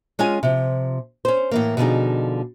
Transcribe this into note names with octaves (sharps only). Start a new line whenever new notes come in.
G#3 C#4 F4 G#5
C3 F3
C#4 C5
A2 E3 A#3
B2 D3 F3 D#4 G#4